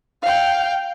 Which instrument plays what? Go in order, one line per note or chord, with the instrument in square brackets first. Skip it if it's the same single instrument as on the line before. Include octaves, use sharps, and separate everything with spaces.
[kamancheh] F5 G5